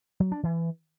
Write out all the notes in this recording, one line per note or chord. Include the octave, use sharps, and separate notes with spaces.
F#3
D4
E3